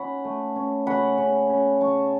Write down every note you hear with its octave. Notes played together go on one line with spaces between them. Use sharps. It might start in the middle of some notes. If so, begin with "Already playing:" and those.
Already playing: C#4 F#5 B5
A3
C#4
C#3 F#5 B5
C#3
C#3
C#3 A5 C#6